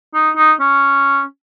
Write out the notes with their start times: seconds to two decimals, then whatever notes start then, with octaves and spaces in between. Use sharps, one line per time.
0.14 D#4
0.36 D#4
0.60 C#4